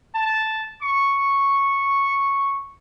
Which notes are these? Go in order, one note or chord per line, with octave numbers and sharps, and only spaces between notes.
A5
C#6